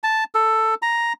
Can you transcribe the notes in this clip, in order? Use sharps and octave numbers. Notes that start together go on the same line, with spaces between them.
A5
A4
A#5